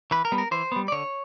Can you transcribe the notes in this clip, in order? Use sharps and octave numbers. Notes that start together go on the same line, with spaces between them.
E3 B4
A#4
G3 B3
A#4
E3 C5
G3 B3
D5
D3 C#5